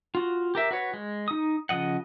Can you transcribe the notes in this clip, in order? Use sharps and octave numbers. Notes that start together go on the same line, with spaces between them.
F4 F#4
G4 A#4 E5
F#4 B4 C#5
G#3
D#4 D#6
C#3 F3 D#5 F#5